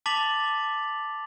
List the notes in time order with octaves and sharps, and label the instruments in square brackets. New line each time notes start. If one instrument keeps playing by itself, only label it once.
[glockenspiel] A5 D6 A6 B6 F7 F#7